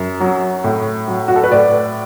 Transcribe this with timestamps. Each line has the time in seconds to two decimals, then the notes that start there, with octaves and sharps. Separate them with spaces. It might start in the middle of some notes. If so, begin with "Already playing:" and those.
Already playing: F#2
0.20 F#3
0.64 A2
1.08 F#3
1.28 F#4
1.36 A4
1.44 B4
1.51 A2 D5